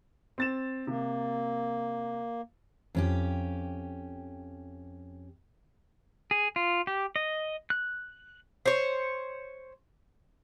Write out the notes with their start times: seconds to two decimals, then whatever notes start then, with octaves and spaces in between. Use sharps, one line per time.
0.38 C4 A6 E7
0.87 C3 A#3
2.95 F2 C#4 G4
6.31 G#4
6.56 F4
6.87 G4
7.16 D#5
7.70 F#6
8.66 C5 C#5